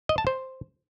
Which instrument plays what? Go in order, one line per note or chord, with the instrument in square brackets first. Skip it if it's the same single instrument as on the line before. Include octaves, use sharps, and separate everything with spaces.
[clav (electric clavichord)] D#5
A5
C5